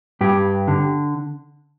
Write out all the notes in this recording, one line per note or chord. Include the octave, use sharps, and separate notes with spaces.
G2 G4
D3